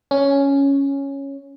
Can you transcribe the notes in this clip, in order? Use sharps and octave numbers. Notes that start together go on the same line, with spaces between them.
C#4